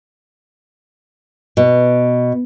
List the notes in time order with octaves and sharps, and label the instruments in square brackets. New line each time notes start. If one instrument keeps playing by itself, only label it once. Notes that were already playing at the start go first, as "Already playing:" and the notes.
[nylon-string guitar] B2